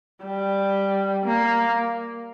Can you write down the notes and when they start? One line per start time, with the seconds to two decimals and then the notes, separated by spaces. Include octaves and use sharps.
0.25 G3
1.26 A#3